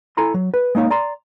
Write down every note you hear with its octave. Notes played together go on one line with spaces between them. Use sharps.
E4 A4 G#5 A#5 C6
F#3
B4
G#3 A#3 D#4 C#5 F5
D5 A#5 C6